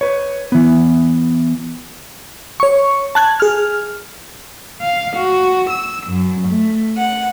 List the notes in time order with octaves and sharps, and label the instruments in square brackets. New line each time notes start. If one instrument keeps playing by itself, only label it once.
[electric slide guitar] B4 C#5
E3 B3
[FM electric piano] C#5 C#6
A5 F#6 G#6
G#4 F6
[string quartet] F5
F#4
E6
F#2
A3
F#5